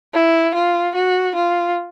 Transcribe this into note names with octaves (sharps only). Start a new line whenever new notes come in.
E4
F4
F#4
F4